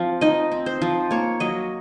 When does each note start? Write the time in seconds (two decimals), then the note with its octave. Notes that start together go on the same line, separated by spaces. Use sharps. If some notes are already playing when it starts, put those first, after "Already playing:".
Already playing: F3 C4 F5
0.21 D#4 D#5
0.52 C4
0.66 C5
0.82 F3
1.11 A#3 C#5
1.40 F#3 D#5